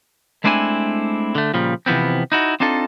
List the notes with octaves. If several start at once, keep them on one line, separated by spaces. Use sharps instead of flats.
G#3 A3 C4 D4 E4 G#5
D3 A3
A#2 C#3 F3 G3
C3 E3 F3 B3 C4
D#4 E4 F#4
C4 D4 D#4 F4 A4